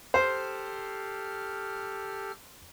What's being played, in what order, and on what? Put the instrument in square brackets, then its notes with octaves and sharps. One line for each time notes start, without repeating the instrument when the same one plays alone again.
[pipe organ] G4 A4 F6 [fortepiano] C5